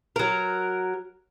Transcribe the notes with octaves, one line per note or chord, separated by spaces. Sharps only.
F#3 A#4